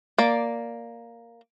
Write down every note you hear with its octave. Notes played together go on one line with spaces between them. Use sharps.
A#3 D5